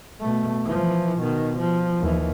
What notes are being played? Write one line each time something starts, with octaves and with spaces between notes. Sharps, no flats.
B2 A3
E3 F3
B2 D#3
F3
D#2 E3